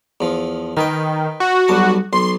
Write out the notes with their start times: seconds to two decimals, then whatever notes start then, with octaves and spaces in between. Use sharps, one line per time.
0.21 E2 F3
0.77 D#3 D#4 B4 G5
1.40 F#4
1.68 B1 G3 A5
2.13 B1 C6